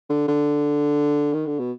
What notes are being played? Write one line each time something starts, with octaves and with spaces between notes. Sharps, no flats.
D3
D3
D#3
D3
B2